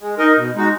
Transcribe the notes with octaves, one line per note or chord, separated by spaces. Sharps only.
G#3
D#4 A#4 D#5
B2
G#3 D#4 F#4